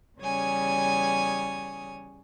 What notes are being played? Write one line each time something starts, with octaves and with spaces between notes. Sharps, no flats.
E2 C#3 G3 C#5 G#5 D#6